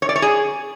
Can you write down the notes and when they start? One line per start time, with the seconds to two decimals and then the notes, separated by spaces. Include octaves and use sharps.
0.02 C#5
0.09 D5
0.16 C#5
0.22 G#4